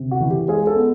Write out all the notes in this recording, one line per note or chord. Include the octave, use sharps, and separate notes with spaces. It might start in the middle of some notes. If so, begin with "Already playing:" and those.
Already playing: C3
F#4
E3
G4
G#3 G#4
A4
B3